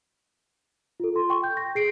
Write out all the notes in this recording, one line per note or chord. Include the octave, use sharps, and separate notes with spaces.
F4 A4
C6
G5 C#6
G6
A#6
G#4 C7 D7